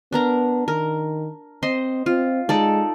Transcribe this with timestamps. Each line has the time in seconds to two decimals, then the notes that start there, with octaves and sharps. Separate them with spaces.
0.13 B3 D4 A#4 A#5
0.68 D#3 A#4
1.63 C4 C5 D#5 C6
2.06 C4 F4
2.49 G#3 D#4 A4 D5